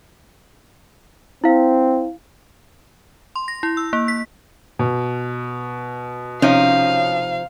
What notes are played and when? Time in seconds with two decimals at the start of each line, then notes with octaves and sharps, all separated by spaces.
1.44 C4 E4 F5
3.36 C6
3.48 A#6
3.63 E4
3.77 E6
3.93 A#3
4.08 B6
4.79 B2
6.42 C3 F3 C#4 D#4 F5